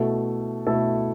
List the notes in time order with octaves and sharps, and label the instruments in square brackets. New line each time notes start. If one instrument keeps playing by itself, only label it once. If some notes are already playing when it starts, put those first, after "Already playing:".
Already playing: [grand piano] B2 A3 E4 A4
B2 A3 E4 A4